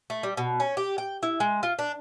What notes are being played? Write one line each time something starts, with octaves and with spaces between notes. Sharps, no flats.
A3
G3
B2
C#4
G4
G5
E4
G#3
F4
D4